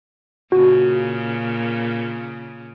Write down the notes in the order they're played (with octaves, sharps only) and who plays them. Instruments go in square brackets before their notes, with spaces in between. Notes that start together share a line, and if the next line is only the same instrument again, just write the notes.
[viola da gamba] A#2 C#3 [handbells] F#4